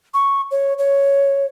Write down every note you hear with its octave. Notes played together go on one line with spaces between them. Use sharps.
C#6
C#5
C#5